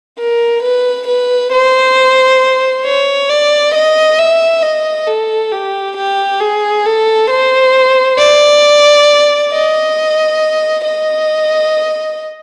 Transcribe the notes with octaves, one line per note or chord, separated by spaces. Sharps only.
A#4
B4
B4
C5
C#5
D5
D#5
E5
D#5
A4
G4
G4
G#4
A4
C5
D5
D#5
D#5